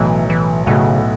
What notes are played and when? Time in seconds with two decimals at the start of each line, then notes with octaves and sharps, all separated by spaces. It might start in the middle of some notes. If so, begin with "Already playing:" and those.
Already playing: B1 A2 E3 F#3 B3 F#4
0.30 E3
0.66 B1 A2 C#3 F#3 B3 F#4